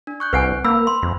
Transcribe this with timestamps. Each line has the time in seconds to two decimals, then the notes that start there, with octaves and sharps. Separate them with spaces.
0.07 D4
0.20 C#6 F#6 G6
0.33 C2 C4 B4 F#5 G#5
0.65 A#3 B5 E6
0.87 C6
1.02 F2